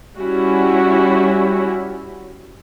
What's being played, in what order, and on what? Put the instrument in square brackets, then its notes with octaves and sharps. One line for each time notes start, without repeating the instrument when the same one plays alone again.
[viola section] G3 C#4 E4 F#4